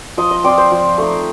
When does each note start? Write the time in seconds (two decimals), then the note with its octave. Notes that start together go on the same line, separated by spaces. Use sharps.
0.17 F3 D#5
0.31 D#5
0.44 C4 F4 D5
0.58 C5
0.71 F3
0.98 A3 D#4